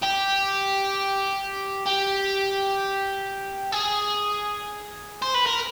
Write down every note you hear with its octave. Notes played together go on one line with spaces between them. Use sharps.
G4
G4
G#4
C5
B4
A#4